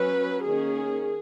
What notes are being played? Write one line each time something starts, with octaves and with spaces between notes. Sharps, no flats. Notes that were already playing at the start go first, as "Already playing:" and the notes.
Already playing: F#3 C#4 B4
D#3 A#3 C#4 G#4